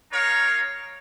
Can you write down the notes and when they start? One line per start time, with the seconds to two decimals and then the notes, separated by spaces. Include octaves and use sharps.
0.11 D#4 A#4 C#5 F5